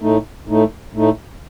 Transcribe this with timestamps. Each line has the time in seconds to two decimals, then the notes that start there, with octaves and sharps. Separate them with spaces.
0.01 A2 A3 D#4
0.47 A2 A3 D#4
0.93 A2 A3 D#4